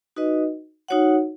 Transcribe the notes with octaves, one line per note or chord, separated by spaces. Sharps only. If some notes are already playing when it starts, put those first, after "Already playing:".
D#4 F#4 B4 D#5
D#4 F#4 C#5 F#5